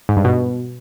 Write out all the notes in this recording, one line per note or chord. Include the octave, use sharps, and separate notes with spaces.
G#2
G2
B2